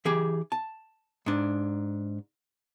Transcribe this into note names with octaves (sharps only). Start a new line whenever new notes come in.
E3 G4 G#4
A5
G#2 D4